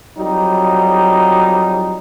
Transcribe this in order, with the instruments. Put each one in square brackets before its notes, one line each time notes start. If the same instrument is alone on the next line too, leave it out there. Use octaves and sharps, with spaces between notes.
[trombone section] F2 F#3 G3 D#4